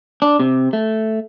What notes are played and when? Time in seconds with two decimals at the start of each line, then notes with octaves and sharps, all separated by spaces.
0.22 D4
0.40 C3
0.73 A3